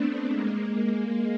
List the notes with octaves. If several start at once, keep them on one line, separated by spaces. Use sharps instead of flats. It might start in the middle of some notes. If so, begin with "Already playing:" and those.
Already playing: A3 B3 C4 D4
G#3 A#3